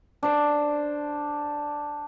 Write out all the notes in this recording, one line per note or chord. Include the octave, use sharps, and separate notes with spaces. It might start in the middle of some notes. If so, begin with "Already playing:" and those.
D4 C5